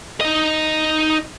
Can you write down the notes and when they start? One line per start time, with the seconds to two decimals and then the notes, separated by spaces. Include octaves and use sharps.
0.21 D#4 D#5